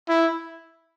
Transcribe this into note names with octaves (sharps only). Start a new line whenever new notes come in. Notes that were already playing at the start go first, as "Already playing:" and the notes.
E4